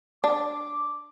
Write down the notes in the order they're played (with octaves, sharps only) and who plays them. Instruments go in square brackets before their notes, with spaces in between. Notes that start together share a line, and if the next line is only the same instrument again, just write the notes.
[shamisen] D4 [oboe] D6